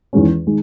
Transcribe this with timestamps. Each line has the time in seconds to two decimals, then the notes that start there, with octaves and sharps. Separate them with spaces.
0.13 E2 D#3 G#3 C#4
0.47 D#3 G#3